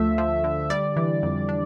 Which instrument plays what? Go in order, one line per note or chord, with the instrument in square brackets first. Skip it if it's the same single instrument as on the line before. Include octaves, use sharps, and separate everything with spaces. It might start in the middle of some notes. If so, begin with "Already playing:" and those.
Already playing: [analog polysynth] D2 F3 A3 E5
F3
D3
G3 D5
E3
F2
D4